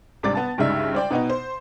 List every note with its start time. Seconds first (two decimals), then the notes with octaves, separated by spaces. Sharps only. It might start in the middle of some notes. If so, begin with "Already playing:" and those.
0.23 G#1 C3 G3 D4 D6 A6
0.35 B3 A5
0.58 C#2 G2 C#3 G3 D#4 E5
0.95 C5 D5 G5
1.11 B2 B3 D#4
1.30 C5